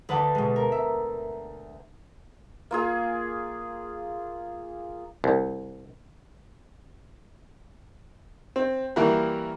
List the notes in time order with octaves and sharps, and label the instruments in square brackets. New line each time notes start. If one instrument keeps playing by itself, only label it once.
[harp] D2 B4 F#5 A5 D6
B2 G#3
A#4
E5
[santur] A#3 F4 G#4
[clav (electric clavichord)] C2
[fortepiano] C4
E3 G3 A#3 E4 F#4 A#4